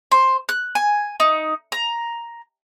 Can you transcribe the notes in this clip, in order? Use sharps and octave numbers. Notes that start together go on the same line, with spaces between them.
C5
F#6
G#5
D#4
A#5